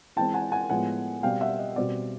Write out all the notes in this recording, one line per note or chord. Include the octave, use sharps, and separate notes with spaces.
E3 G#3 C4 G5 A5
F#5 G#5
F#5 G#5
A2 F3 G#3 B3 F#5 G#5
B2 G3 C4 F5 G5
E5 F#5
D#5
B2 G3 C4 D5